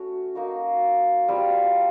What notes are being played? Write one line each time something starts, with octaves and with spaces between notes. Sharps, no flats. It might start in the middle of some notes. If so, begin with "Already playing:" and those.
Already playing: A3 C#4 F#4
A#3 D#4 F#4
G3 C4 F4